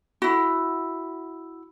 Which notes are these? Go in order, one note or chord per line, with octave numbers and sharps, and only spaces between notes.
E4 F#4